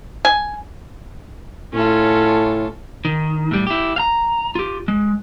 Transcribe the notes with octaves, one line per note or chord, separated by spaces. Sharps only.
G#5
A2 C#4 F4 A4
D#3
A2 G3
E4 G4
F5 A#5
F4 G4
G#3